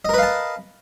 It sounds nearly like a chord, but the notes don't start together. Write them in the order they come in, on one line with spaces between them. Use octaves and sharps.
D#5 A#4 B4 F5 A5